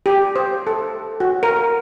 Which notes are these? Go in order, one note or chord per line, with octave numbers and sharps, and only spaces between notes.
G4
C5
A4
F#4
A#4